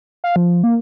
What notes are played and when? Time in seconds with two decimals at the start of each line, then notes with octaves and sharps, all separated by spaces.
0.24 F5
0.36 F3
0.63 A#3